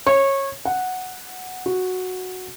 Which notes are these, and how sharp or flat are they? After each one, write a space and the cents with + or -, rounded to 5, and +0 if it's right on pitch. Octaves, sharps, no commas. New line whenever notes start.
C#5 -20
F#5 -5
F#4 -5